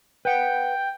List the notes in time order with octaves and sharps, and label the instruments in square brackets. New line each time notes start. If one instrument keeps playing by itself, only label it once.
[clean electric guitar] B4 F#5 [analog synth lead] G5